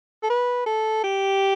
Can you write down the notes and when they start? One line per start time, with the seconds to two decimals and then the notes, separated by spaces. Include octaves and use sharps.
0.23 A4
0.30 B4
0.66 A4
1.03 G4